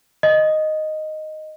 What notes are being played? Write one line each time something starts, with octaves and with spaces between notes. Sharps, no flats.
D#5